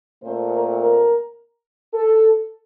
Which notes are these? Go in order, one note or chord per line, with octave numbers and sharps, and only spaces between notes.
A#2 A3 C4 C5
A#4
A#4
A4